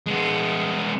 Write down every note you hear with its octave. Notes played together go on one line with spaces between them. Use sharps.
G#3 B3